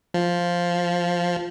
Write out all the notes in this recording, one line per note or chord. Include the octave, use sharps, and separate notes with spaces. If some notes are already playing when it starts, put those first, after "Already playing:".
F3